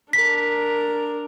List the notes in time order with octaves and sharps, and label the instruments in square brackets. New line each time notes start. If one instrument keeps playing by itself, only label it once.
[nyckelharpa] D4 A#4 [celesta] B6